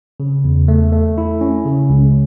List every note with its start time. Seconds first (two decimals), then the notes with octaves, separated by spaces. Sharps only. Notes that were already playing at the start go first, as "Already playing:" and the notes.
0.20 C#3
0.44 E2
0.68 A3
0.92 A3
1.18 E4
1.41 C#4
1.65 C#3
1.90 C#2